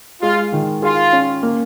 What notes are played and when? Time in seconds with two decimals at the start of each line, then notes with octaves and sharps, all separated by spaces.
0.22 G#3 F4
0.52 D#3
0.82 F4 G#4
1.12 C#4
1.43 A#3